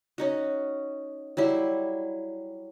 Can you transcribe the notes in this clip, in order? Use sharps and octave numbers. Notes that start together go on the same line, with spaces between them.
C#4 D#4 F#4
F#3 G3 E4 C5